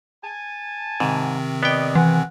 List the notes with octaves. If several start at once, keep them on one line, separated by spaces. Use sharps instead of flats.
G#5 A5
G#2 C3 D#3 C4
B3 D5 D#5 G5
E3 F#5 G#5